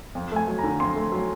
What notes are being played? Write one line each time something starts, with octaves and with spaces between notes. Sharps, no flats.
F2
A3 G#5
F#3
A#5
D3
F2 C6
A3
F#3